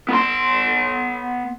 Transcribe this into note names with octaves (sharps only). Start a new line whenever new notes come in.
B3 C6